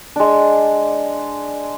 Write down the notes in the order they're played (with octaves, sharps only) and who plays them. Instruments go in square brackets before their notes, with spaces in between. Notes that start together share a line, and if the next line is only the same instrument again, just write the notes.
[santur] G#3 D4